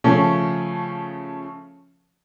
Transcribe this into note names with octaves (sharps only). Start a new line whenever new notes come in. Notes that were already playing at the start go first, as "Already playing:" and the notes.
C#3 F3 A3 C#4